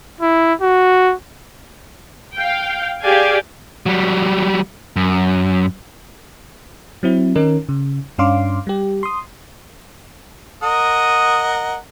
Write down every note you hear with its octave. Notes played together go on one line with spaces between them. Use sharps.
E4
F#4
F5 G5
G4 G#4 D5 F5 G5 G#5
F#3 G3
F#2
F#3 C4 E4
D#3 C#4 D#4 A#4
C#3
G2 C#4 D4 F5 C6 D6
G3 G4
C6 D#6
A#4 D#5 F#5 D#6